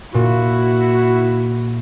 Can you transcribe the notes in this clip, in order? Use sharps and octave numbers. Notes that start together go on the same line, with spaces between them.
A#2 E4 F#4